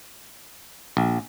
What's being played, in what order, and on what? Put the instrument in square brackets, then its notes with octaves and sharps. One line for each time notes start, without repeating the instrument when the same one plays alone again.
[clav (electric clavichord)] A#1